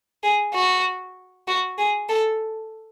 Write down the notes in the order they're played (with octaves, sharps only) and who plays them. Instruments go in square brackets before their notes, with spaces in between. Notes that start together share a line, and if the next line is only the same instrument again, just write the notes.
[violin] G#4
F#4
F#4
G#4
A4